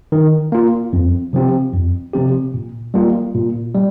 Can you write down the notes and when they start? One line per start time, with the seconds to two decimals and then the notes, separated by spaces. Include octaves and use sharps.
0.12 D#3
0.52 A#3 F4
0.93 F2
1.33 C3 F3 C4 G4
1.73 F2
2.14 C3 F3 C4 G4
2.54 A#2
2.94 G3 A#3 F4
3.34 A#2
3.75 G3